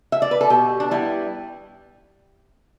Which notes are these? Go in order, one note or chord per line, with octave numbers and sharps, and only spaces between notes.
E5
D5
B4
A4
B2 G4
D4
G3 B3 E4